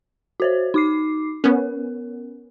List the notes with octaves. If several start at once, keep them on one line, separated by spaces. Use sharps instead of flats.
F#4 C5 C#5
D#4 D6 C7
B3 C#4 A#4